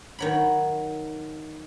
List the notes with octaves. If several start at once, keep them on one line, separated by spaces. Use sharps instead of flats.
D#3 F#3 B5